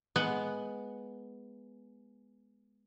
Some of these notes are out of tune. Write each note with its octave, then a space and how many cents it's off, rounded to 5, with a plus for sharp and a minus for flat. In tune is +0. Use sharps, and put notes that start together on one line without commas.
G#3 +10 B3 +0 F#5 +0